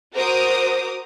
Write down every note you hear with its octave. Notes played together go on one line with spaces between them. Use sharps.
F#4 A#4 C5 A#5 D6 D#6